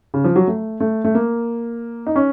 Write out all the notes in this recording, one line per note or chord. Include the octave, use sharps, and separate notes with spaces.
C#3
F3
F#3
A3
A3
A3
A#3
D#4
C#4